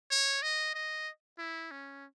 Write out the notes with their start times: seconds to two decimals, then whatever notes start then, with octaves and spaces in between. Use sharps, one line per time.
0.11 C#5
0.43 D#5
0.75 D#5
1.38 E4
1.71 C#4